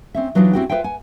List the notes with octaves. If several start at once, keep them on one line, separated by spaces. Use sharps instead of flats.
C4 C#4 E5
E3 F#3 D4 D#4 F4 F#4
C4 C#4 E4 F#4 G4 G5
F4 G4 B4 C5 E5 G5
F#5 G#5